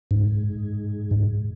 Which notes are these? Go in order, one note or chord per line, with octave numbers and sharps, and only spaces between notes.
G#2